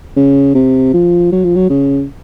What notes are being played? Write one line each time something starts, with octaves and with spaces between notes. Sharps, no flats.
C#3
C3
F3
F#3
F3
F#3
C#3